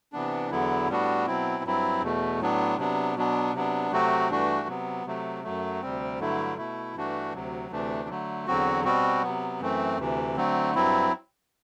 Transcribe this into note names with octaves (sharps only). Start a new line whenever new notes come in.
C3 E3 B3 D4
E2 D3 F#3 B3 E4
A2 G3 B3 D4 F#4
B2 F#3 C4 E4
G2 F#3 C4 E4
E2 B2 A3
A2 F#3 B3 D4
C3 F#3 B3 D4
B2 F#3 B3 D4
C3 F#3 B3 D4
C3 F#3 A3 C4 F#4
G2 E3 A3 D4 F#4
C3 F#3 B3
C3 F#3 A3
F#2 F#3 A3
D2 C3 G3 C4
G2 D3 F#3 A3 E4
B2 A3 E4
G2 E3 A3 D4 F#4
D2 C3 F#3
D2 C3 E3 A3 D4
D3 F#3 A3
E2 D3 F#3 C4 F#4
B2 G3 C4 F#4
C3 F#3 B3
F#2 E3 A3 C4
D2 C3 E3
D3 F#3 A3 C4
G2 F#3 C4 E4